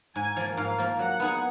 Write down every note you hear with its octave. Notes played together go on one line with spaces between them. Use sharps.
G#2 G#5
F3 A#3
G#2 F5
F3 A#3
F#3 F#5
B3 D#4 G#4